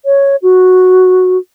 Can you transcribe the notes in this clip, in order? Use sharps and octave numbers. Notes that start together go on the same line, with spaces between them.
C#5
F#4